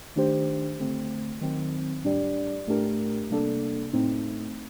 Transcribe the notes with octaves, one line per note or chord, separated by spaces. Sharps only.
D#3 A3 D4 G4 C5
D3 A3 C4
D#3 F#3 C4
A2 G3 D4 G4 D5
A2 A3 D4 G4 A#4
C3 G3 A#3 D4 A4
A2 A3 C4 D#4